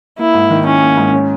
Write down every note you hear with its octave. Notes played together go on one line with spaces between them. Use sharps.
A#3 E4
G#2
D#3
C#4 E4
A#3
G#2
C#4